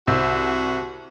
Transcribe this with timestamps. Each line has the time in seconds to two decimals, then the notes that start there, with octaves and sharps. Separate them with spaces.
0.07 C2 C4 F#4